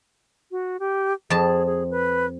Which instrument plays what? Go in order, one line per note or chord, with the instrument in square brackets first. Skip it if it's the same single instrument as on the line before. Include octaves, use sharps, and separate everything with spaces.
[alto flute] F#4
G4
[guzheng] F2 A5 [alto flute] G#4
[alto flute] G#4
B4